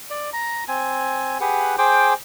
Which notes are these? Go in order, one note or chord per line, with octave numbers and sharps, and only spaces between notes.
D5
A#5
C4 G#5
G4 G#4 B4 F#5
G#4 C5 G5 D6